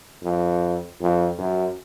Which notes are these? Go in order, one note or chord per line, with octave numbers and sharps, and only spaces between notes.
F2
F2
F#2